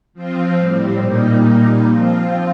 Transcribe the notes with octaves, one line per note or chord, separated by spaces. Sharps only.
F3 C4 F4
A2 G3 C4
A#2 G3 A#3 D#4
A#2 G3 A#3 D#4
F3 C4 F4